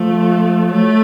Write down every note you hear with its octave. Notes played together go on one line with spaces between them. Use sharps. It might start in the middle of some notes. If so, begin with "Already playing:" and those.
Already playing: F3 A3
F#3 A3